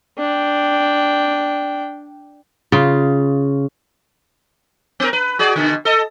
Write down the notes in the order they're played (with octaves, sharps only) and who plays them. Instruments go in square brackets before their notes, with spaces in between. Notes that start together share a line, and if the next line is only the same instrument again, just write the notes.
[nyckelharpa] D4 G5
[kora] C#3 F4
[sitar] B3 A#4
B4
F#4 G#4 D5
B2 D3
A4 D#5